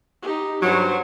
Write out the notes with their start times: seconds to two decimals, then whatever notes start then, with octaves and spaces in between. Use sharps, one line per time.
0.22 D#4 G4
0.62 G2 F#3 C#4 C5